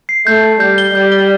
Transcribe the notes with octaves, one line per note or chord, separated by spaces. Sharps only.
C7
A3 G6
G6
G3 G6
G7
G3 G6
G7